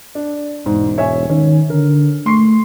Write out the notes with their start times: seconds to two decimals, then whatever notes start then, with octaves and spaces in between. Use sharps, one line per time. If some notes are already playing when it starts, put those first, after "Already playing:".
0.15 D4
0.66 E1 G#2
0.98 C#5 E5 G#5
1.30 D#3 C#4
1.70 D3 A#4
2.26 A3 C6 C#6 C7